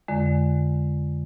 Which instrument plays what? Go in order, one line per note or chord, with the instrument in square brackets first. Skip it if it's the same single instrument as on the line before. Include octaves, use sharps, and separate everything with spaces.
[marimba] F2 D3 G#3